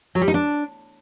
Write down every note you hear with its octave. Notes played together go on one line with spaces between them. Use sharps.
F#3
G3
D#4
D4